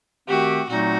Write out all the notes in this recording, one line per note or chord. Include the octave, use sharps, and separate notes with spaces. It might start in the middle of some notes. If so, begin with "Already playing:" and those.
D#3 A3 C4 F#4 G4
A#2 F#3 A3 C4 D#4 F#4